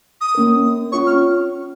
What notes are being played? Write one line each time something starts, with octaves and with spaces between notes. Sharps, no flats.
D#6
A#3 C#4 A#4
C#4 F4 C#5 C#6
F6